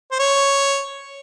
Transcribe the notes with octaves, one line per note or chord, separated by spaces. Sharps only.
C5
C#5